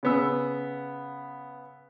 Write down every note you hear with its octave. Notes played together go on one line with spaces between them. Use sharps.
C#3 B3 E6